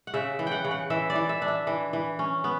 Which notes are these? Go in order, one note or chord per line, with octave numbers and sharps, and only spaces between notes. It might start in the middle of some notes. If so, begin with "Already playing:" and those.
F#5
C#3 E5
E3
F#5 G5
C#3
F#5
E3 E5
D5
E3
E5
D4
E5
E3
E3
C#4
B3